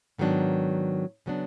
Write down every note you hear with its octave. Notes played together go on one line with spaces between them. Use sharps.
G#2 D#3 F#3 B3 D4
C#3 F#3 B3 D4